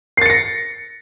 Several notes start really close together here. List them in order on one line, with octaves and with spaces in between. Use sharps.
C7 A6 C#7 A#6